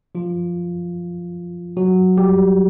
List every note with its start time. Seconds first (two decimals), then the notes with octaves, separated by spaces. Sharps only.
0.15 F3 F4
1.77 F#3 F#4
2.18 G3 G4